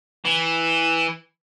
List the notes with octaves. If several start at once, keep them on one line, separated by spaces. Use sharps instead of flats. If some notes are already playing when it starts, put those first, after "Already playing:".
E3